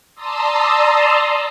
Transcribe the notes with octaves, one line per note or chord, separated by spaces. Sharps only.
D5 A5 A#5 C6 D#6 E6